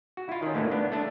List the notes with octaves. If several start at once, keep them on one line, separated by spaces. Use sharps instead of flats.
F#4
E4 F4
D#3 C#4
D2 A2 E3 A3 A#3
B3 D4
A3 D4